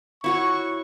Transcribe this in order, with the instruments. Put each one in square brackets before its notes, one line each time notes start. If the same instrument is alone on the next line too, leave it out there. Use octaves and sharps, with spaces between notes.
[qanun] E4 F#4 C#5 [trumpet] C#6